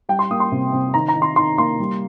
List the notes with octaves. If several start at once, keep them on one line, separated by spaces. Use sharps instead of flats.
G3 G5
C6
A#3 D#6
C6
C3
C3
D#3 A#5
A#5
D#3
C6
D#3 C6
A#3 C6
G3